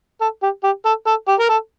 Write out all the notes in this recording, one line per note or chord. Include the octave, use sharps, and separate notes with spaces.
A4
G4
G4
A4
A4
G4
A#4
A4